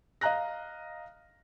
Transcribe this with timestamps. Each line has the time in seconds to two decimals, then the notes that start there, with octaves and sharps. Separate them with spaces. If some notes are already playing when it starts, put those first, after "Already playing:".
0.21 D#5 F5 A#5 F#6 A#6